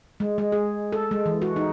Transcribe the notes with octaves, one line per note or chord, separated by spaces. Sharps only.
G#3
G#3
G#4
A4
G#3
E3
F#4
D#4